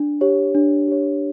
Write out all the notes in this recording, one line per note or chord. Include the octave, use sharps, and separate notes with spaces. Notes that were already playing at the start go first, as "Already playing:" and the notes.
Already playing: D4
G4 C#5
D4
G4 C#5